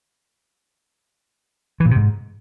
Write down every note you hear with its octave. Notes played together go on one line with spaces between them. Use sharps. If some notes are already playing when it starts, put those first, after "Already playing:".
E3
A#2
C3
G#2